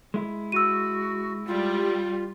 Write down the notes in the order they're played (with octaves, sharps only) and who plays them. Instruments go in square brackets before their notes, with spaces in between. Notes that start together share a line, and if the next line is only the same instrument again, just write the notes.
[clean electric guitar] G#3 E4
[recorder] F#4 [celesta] E6 D#7
[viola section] G3 [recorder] F4